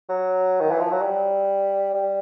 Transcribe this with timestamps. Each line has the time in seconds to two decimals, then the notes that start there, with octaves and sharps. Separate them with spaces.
0.09 F#3
0.61 D#3
0.71 E3
0.80 F3
0.92 F#3
1.02 G3
1.94 G3